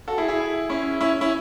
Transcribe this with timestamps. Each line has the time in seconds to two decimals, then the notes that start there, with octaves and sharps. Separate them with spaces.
0.08 F#4 A4
0.18 E4 G#4
0.28 E4 G#4
0.70 C#4 E4
1.01 C#4 E4
1.21 C#4 E4